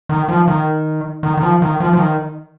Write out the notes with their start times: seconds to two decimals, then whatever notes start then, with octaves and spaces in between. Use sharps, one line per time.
0.09 D#3
0.29 F3
0.48 D#3
1.23 D#3
1.37 D#3
1.43 F3
1.62 D#3
1.80 F3
1.93 F3
1.99 D#3